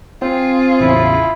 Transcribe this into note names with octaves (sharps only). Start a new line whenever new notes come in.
C4 F4 G#4
A1 E2 C#3 E4